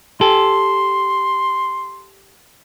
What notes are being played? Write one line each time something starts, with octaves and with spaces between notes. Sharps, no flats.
G4 A4 C6